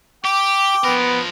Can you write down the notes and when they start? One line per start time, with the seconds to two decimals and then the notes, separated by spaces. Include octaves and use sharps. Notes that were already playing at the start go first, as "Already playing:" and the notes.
0.25 G4 G5 D6
0.84 F3 B3 A#4